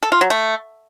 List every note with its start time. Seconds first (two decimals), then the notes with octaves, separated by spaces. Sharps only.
0.03 A4
0.12 F4
0.21 F#3
0.30 A3